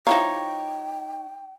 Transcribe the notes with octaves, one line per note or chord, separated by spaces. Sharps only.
F3 D#4 E4 C#5 F5 G5 A#5